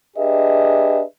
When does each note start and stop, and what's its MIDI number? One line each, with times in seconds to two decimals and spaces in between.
0.16 1.02 62
0.16 1.02 67
0.16 1.02 68
0.16 1.02 71
0.16 1.02 75
0.16 1.02 76